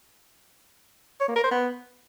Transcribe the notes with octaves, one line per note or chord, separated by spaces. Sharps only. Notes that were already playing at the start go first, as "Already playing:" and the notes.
C#5
A#3
A#4
C5
B3